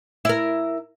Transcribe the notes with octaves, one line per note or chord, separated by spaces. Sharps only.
E4 A#4